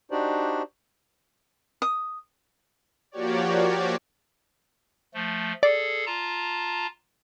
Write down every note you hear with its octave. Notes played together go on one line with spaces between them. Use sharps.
D4 D#4 F#4 G4 C5 D5
D#6
F3 A#3 F#4 G4 C#5 D5
F3 A3
G#4 A4 D5
F4 A5 A#5